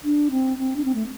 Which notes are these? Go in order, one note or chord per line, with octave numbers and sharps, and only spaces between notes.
D4
C4
C4
D4
C4
A3